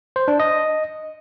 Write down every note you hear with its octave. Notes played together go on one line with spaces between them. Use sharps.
C5
D4
D#5